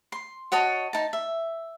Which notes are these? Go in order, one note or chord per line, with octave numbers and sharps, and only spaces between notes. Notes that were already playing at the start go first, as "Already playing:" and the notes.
C6
F#4 C#5 D#5 A5
D#4 A5
E5